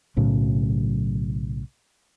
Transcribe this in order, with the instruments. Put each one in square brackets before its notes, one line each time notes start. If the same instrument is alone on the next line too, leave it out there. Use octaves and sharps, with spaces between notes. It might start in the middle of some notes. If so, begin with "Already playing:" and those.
[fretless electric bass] B1 A2 C#3 F#3